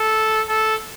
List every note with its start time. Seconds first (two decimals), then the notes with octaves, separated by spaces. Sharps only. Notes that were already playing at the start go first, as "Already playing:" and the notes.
Already playing: A4
0.49 A4